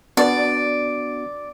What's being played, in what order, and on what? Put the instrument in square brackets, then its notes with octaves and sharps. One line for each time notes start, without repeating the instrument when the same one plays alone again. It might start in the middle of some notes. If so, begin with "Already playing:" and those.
[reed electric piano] B3 D4 F#4 [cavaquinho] D5